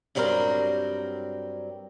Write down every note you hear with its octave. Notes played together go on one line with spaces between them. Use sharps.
G2 F#3 G3 C4 A#4 G5